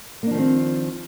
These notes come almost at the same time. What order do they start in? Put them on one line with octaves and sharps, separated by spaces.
A#3 D4 F3 D#3 C4